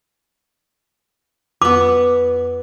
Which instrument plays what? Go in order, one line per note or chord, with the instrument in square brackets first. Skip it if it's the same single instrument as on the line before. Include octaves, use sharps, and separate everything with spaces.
[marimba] F2 [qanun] B3 B4 [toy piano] D6